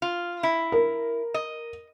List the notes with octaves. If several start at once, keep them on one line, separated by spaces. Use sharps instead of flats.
F4
E4
A#4
D#5